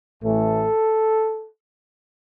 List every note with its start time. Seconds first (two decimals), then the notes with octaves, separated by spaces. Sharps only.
0.22 A1 A2 E3 A3 A4